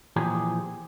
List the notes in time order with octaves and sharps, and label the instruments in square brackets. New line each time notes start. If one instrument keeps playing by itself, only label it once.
[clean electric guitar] A#2 E3 F3 G4 G#4